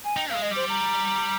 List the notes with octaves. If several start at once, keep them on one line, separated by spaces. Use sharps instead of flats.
G#5
D#4 G5
G#3 F5
D#5
G3
C5
A#5